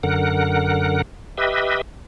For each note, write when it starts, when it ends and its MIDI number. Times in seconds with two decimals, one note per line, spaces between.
0.03 1.02 42
0.03 1.02 50
0.03 1.02 70
0.03 1.02 78
1.37 1.81 67
1.37 1.81 71
1.37 1.81 75
1.37 1.81 76